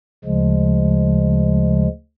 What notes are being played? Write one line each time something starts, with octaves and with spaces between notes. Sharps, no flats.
D2 C#3 F3 G#3